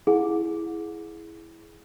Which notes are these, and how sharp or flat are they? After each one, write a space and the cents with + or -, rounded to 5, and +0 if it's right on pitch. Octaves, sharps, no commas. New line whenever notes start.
E4 +0 G#4 +15 F#5 -35